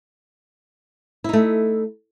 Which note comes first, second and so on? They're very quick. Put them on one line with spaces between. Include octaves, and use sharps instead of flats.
E4 D#4 A3